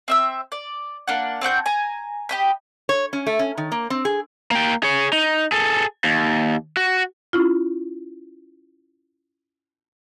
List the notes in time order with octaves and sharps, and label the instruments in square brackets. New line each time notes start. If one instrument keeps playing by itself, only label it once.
[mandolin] C4 E5 E6
D5
A#3 D4 F#5
C4 D4 F#4 G6
G#5 A#5
G4 D#5 B5
[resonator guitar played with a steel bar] C#5
C#4
A3
C#4
D#3
A#3
C4
G#4
[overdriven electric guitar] A#3 G5
G#4 C#5
D#4
G#4 A4
D#2
F#4
[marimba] C#4 E4 F4